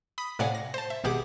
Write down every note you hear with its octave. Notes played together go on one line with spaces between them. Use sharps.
B5 D#6 B6
A2 C3 D5 F5 F#5 G#5
A#6
C5 A5
E5
G#1 B2 G4 G#4 F#5 D6